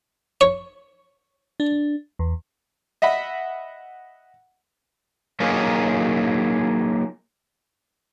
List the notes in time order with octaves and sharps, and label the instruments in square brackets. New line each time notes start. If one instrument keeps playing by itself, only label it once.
[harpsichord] C#5
[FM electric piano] D4
E2
[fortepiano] D#5 E5 F#5 B5
[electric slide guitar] F#3 A#3 C#4 D#4 F4 G#4